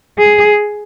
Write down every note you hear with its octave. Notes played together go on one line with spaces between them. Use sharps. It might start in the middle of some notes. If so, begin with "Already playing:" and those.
G#4